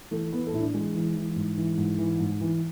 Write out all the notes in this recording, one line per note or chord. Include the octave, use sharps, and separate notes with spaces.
E3 A3
E3 B3
A4
A2 E4
D4
E3 G#3
E3
E3
G#2
E3
G#2
E3
G#2
E3